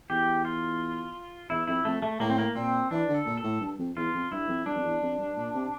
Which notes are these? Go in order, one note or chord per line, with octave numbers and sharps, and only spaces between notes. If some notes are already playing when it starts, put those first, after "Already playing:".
E2 G4
F4
E2 E4
F2 E4
F2 A3
A3
A2 A#3
C4
A#3
A#2 C4
E3 D4
D3
A4
A#2
A4
A2
G2
F2
E2 F4
F2
G2 E4
F2
G2 D4
F2
E2
F2
G2
A#2
C3